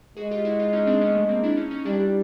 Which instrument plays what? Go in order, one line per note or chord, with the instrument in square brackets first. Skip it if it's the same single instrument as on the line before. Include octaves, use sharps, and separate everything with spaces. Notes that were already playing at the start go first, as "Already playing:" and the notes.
[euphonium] G#3 [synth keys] F#4 G#4
[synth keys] F4 G4
E4 F#4
D#4 F4
C#4 D#4
C4 D4
B3 C#4
A3 B3
A#3 C4
D4 E4
C#4 D#4
C#4 D#4
[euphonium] G3 [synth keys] D4 E4